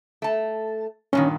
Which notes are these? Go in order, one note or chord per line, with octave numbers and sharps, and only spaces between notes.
A3 A5
G2 A#2 D#3 C#4